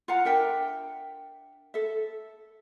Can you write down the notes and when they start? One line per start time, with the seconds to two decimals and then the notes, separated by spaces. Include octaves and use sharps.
0.08 F4 F5 F#5 A#5
0.25 D4 A#4 E5 G5
1.74 A4 E5